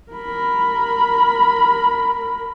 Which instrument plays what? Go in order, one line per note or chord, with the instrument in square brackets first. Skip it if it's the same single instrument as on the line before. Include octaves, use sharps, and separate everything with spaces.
[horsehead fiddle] A#4 B5